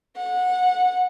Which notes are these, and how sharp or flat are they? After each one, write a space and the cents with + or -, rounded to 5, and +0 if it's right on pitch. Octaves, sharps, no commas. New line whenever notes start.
F#5 -20